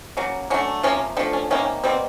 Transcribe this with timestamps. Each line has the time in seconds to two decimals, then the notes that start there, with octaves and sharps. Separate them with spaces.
0.17 C#3 F#3 A#3
0.50 D3 F#3 A3 C#4
0.83 C3 F3 A#3 C#4
1.17 D3 F3 A3 C4
1.33 C#4
1.51 C3 D#3 G3 A#3 C#4
1.84 B2 G3 A#3 C4